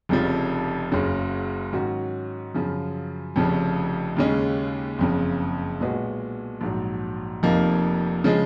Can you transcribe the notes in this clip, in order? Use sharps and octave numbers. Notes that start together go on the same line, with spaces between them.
F1 F2 C#3 F3
F#1 F#2 C#3 F#3
G#2 D#3 F#3 C#4 F#4
F#2 C#3 F3
F1 F2 C#3 F3
D#2 C#3 G#3 C#4
F#1 F2 C#3
B1 A#2 G#3 B3 F#4
A#1 G#2 F#3
F1 F2 F3 A#3 D#4
C#3 F3 G#3